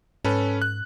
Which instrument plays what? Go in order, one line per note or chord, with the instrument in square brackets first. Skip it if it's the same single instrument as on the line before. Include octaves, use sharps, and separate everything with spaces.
[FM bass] G#2 [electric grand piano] C#4 A4 B4
[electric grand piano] F#6